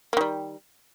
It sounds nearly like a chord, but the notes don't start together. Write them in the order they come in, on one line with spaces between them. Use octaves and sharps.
A#3 D#3 G3